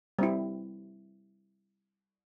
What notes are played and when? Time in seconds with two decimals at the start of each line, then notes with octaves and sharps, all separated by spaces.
0.19 G3 C4 E4